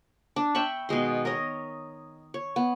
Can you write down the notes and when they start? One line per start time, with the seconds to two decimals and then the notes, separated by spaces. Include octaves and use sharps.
0.36 D4
0.55 E5 G5 B5 C#6
0.89 B2 D#3 G#3 C6
1.25 A#4 C#5 D#5
2.34 C#5
2.56 B3